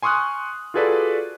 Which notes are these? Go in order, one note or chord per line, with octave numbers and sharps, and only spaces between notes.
G#5 C6 C#6 D#6 F6 F#6
F4 F#4 G#4 A4 B4 D5